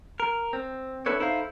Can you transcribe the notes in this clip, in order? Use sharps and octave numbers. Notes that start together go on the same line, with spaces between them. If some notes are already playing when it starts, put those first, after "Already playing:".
A#4
C4
C4 D4 E4 A4 B4 C#5
D#4 E4 A4 C5 F5